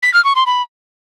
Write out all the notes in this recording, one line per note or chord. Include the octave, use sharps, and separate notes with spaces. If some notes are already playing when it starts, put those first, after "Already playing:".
B6
F6
C#6
C6
B5